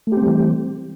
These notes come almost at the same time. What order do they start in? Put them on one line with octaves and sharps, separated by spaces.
A3 G4 C4 G3 E3